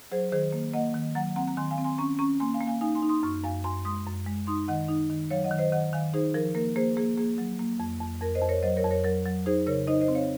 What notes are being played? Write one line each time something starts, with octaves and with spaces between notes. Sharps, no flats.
F#3 G#4 C5
D#3 G#4 C5
A#3
A#3 D#5 F#5
D#3
F#3 F#5 A#5
C4 F#5 A#5
A#5
D#3 G#5 C6
F5 G#5
C4
G#5 C6
C#4 A#5 C#6
C#4 A#5 C#6
A#3 G#5 C6
F5 G#5
A#3
F5 G#5
D#4 F5 G#5
G#5 C6
D#4
C6 D#6
F#2 C#6 F6
F#2 F5 G#5
F#2 G#5 C6
G#3 C6 D#6
F#2
G#3
D#4 C6 D#6
D#3 D#5 F#5
D#4
D#3
F#3 C#5 F5
D#5 F#5
D#3
C5 D#5
D#3 D#5 F#5
D#3 F5 G#5
D#4 G#4 C5
F3 A#4
A#3 A#4
A#3 G#4 C5
A#3 G#4
A#3 G#4
F#3
A#3
F2
F2
F2 A#4
C5 D#5
F2
A#4 C#5
F#3 C5 D#5
A#4 C#5
F2
A#4 C#5
F#3 A#4
F#3
D#4 G#4 C5
C#3 A#4 C#5
D#4 C5 D#5
C5 D#5
C4
C#5 F5